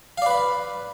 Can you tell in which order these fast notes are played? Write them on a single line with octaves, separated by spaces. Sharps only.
F5 D5 B4 B5